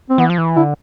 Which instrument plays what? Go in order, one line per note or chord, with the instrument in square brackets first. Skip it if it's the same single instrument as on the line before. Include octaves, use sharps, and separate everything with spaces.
[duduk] C4
[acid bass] E3 [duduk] B3
[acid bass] F3
E3
[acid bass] D3 [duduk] E4